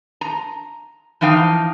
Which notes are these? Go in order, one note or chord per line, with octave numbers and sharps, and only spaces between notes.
A#5
E3 F3 D#4 F5 G5